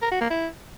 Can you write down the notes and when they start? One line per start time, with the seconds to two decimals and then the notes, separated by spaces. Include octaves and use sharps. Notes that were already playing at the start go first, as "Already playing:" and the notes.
0.02 A#4
0.11 F#4
0.21 A#3
0.30 E4